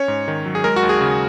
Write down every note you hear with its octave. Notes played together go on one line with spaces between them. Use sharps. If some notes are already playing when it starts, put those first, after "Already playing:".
Already playing: C#4 C#5
G#2
D#3
F#3
G#4
G#3 A#4
F#4
D#2
G#4
C#3